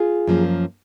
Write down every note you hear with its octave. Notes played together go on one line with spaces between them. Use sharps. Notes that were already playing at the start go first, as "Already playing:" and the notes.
Already playing: F4 G#4
F#2 F3 A#3